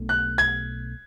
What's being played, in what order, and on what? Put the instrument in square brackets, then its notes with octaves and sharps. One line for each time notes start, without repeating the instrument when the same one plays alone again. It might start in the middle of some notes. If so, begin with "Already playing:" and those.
Already playing: [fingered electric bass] B1 B2 A3 D4
[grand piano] F#6
G#6